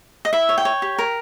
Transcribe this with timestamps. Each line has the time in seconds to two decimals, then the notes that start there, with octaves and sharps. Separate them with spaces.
0.25 D#5
0.33 E4 E5
0.49 C#5
0.58 G5
0.65 C#5
0.82 G4
0.98 A#4